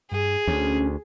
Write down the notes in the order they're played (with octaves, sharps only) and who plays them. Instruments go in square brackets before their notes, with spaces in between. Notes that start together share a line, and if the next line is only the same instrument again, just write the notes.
[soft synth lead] G2 [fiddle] G#4
[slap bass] D2 [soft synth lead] C#4